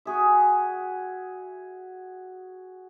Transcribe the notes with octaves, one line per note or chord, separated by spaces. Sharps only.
F#4 G#4 E5